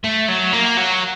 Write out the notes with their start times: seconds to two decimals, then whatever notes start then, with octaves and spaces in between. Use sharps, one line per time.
0.04 A3
0.28 F#3
0.53 A#3
0.77 F#3